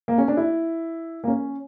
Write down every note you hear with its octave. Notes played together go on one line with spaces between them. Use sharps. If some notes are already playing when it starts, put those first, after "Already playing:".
A#3
C#4
D4
E4
A#3
C#4